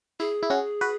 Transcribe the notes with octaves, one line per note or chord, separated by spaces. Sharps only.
E4 G#4
E4
C#4 F#4
F#4 B4